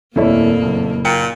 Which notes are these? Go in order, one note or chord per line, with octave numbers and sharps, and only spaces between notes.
D#1 F2 A#2 A3 A#3 E4 C#5 D5
F#1
A#2 G5 C#7